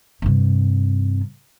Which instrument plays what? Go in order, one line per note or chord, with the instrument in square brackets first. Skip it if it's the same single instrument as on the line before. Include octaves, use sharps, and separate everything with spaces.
[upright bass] G2 C3